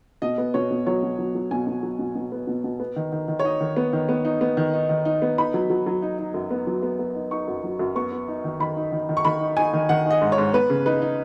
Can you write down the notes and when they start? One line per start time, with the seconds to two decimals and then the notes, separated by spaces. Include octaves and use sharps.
0.22 B2 D#5
0.38 B3
0.54 B2 C#5
0.71 B2
0.87 F#3 C#5
1.03 B2
1.19 F#3
1.35 F#3
1.51 B2 G#5
1.67 B2
1.83 F#3
1.99 B2
2.16 B2
2.32 B3
2.47 B2
2.64 B2
2.80 B3
2.96 D#3
3.12 D#3
3.28 D#3
3.39 C#5
3.44 D#4 D#5
3.61 D#3
3.77 B3
3.93 D#3
4.09 B3
4.25 D#4
4.41 B3
4.57 D#3
4.74 D#4
4.89 D#3
5.05 D#4
5.22 B3
5.38 D#4 B5
5.54 F#3
5.70 F#3
5.86 F#3
6.02 D#4
6.18 D#4
6.34 F#2
6.51 B3
6.67 F#3
6.83 B3
6.99 B3
7.15 D#4
7.31 D#4 C#6
7.48 F#2
7.64 F#3
7.79 F#2
7.95 B3 C#6
8.12 B3
8.28 D#4
8.44 D#3
8.60 D#3 B5
8.77 D#4
8.92 D#3
9.09 D#3
9.17 C#6
9.25 D#3 B5
9.41 D#4
9.57 D#4 G#5
9.73 D#3
9.89 D#3 F#5
10.05 D#4
10.11 D#5
10.21 G#2
10.32 C#5
10.38 G#2
10.53 B3 B4
10.70 C#3
10.86 D#4 B4
11.02 D#4